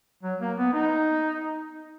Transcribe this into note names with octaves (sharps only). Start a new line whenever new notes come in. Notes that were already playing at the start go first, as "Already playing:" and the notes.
F#3
A#3
B3
D#4